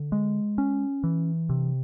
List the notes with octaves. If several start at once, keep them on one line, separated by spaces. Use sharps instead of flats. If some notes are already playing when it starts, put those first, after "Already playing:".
Already playing: D3
G#3
C#4
E3
C3